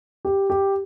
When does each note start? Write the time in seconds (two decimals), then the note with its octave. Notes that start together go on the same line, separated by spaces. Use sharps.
0.25 G4
0.50 G4